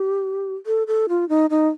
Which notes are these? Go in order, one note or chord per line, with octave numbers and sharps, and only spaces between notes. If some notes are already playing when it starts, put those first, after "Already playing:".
Already playing: G4
A4
A4
F4
D#4
D#4